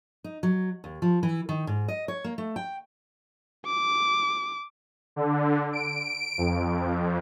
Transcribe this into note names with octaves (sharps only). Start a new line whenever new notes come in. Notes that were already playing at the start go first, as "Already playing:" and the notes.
D#4
F#3
D#2
F3
E3
D#3
G#2
D#5
C#5
A#3
A3
G5
D6
D3
D7
F2